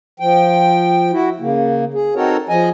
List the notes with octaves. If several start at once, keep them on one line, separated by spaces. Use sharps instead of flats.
F3 G5
E4 F#4
C#3 A#3
G#4
C4 D#4 F#4 A4 A#4 C#5
F3 G#4 D#5 G#5